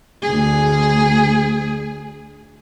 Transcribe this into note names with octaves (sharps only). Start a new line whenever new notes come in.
D2 G#4